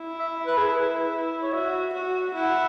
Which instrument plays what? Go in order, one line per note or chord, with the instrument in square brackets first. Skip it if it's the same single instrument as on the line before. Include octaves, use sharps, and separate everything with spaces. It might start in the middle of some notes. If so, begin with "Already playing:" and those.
Already playing: [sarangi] E4
[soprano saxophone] E5
B4
G#4
B4
C#5
[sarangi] F#4 [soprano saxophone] E5
[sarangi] F#4
[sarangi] E4 [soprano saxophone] F#5